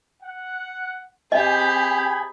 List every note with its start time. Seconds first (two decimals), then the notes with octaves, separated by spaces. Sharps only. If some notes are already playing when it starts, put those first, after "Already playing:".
0.23 F#5
1.32 C4 G4 G#4 D#5 G5 G#5 A#5 B5